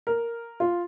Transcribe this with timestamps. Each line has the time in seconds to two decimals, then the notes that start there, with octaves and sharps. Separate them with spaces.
0.07 A#4
0.60 F4